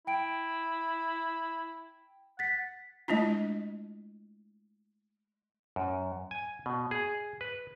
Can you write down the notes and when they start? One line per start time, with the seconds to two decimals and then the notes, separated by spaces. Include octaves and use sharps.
0.07 E4 G5 D7
2.39 F#5 A6 B6
3.08 G#3 A3 D4 E4 F4
5.76 F#2
6.31 G#5
6.66 B2
6.91 G#4
7.41 B4